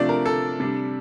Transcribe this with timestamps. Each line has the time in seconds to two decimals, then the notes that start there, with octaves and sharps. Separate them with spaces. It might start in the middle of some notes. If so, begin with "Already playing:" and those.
Already playing: C3 F3 A3 D4 D5
0.09 A#4
0.26 A4
0.60 C3 G3 D4